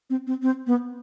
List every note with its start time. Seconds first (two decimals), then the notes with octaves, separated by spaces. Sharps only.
0.10 C4
0.27 C4
0.42 C4
0.67 B3